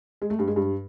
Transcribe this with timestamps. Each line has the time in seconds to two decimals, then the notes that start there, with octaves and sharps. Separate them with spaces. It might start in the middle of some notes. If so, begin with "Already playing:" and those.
0.22 G#3
0.30 A3
0.39 G2
0.48 G#3
0.56 G2